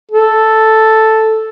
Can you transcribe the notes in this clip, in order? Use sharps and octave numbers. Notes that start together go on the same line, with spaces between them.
A4